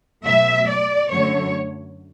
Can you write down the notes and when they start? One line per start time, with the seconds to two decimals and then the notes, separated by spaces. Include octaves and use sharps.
0.25 B2 F#3 A3 E5
0.69 D5
1.11 F#2 D3 F#3 A3 C#5